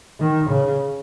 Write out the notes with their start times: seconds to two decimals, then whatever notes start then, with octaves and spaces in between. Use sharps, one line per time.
0.20 D#3
0.50 C#3